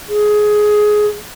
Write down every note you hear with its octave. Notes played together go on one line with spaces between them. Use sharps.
G#4